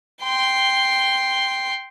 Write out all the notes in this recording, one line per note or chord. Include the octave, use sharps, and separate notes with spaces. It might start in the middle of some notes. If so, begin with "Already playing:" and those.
G5 C6